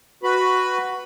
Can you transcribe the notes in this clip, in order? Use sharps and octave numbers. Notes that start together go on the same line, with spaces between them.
F#4 B4 B5